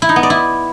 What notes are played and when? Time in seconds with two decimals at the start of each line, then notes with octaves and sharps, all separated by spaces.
0.02 E4
0.09 D#4
0.16 B3
0.23 D5
0.30 E4